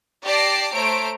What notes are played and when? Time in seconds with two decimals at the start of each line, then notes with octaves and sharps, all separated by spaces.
0.24 G4 D5 A5 A#6 C7 D7
0.73 A3 C5 C#5 A#5 D7